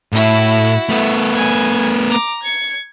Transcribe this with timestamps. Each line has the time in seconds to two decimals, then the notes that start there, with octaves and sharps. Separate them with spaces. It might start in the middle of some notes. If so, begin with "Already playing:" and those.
0.13 A2 E4 F#4
0.89 A3 B3
1.35 G#5 G#6
2.10 A#5 D6
2.42 G#6 C#7